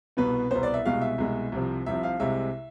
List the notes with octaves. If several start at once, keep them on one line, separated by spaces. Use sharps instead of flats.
C2 B2 B3 B4
C2 B2 B3 C5
D5
E5
C2 B2 G#3 F5
E5
C2 B2 G#3
C2 C3 F3
C2 C3 F3 E5
F5
C2 C3 G#3 E5